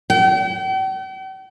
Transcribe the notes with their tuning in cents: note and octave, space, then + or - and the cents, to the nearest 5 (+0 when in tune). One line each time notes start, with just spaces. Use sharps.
G5 -45